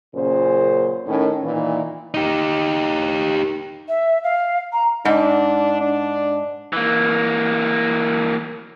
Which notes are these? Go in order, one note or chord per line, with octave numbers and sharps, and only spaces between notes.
F#2 A#2 C#3 C5
A2 D#3 C#4
A#2 D#3 E3
D#4 G4
E5
F5
A#5
G#2 D4
D4
E3 A#3